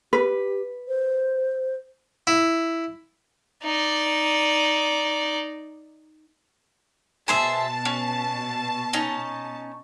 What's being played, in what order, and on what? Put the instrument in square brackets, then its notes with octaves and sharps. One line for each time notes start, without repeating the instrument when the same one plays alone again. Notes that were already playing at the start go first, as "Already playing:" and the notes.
[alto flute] G4 [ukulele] B4
[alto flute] C5
[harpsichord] E4
[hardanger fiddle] D#4 D5
[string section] B2 A5 [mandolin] G#4 C5 E5
[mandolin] C#4
C#4 D#4